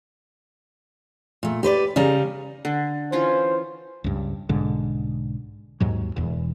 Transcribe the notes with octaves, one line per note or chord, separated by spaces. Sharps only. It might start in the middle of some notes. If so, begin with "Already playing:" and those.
A#2 A3
G4 B4 C5 D5
C#3 G3 C#4 A#5
D3
E3 C#4 F4 C5
C#2 G2
B1 G#2 D3
D#2 G#2 F#3
E1 E2